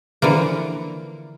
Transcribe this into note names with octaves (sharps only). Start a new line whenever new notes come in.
D3 E3 F3 A#3